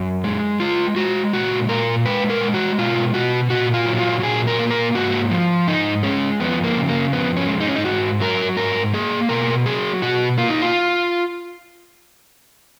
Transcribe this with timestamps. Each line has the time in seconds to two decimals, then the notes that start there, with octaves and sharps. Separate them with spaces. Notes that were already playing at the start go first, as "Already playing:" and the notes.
Already playing: F#2
0.24 G#3
0.60 G#3 F4
0.96 G#3 F#4
1.33 A#2 F#4
1.69 A#2 A#4
2.06 G#3 B4
2.30 A#4
2.41 G#3
2.54 F#4
2.78 B2 F4
3.14 B2 F#4
3.50 A#2 F#4
3.74 F4
3.86 F#3
3.99 F4
4.22 A#2 G#4
4.47 A#4
4.59 A#3
4.71 A#4
4.95 G#2 F#4
5.31 F3
5.68 G#2 D#4
6.03 G#3 C#4
6.40 F2 B3
6.64 A#3
6.76 C#3
6.88 A#3
7.12 F2 B3
7.37 C#4
7.48 G#3
7.60 D#4
7.67 C#4
7.75 D#4
7.84 G#2 F#4
8.20 F#3 A#4
8.56 G#2 A#4
8.93 A#3 G#4
9.29 B2 A#4
9.66 F#3 G#4
10.02 B2 F#4
10.38 A#3 F4
10.50 D#4
10.62 F4